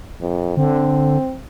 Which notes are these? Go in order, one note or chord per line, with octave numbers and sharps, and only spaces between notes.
F2
D3 C4